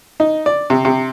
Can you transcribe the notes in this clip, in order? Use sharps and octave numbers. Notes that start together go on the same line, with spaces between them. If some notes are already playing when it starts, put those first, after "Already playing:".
D#4
D5
C3
C3